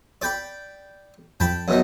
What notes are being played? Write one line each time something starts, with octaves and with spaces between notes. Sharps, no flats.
D5 G5 B5
F2 G5 A5 B5
F#2 B2 D#4